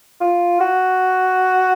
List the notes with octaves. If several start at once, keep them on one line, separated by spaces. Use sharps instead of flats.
F4
F#4